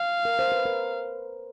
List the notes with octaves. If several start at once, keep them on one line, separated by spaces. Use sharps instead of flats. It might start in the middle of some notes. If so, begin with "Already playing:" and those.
Already playing: F5
A#4
C5
B4
A#4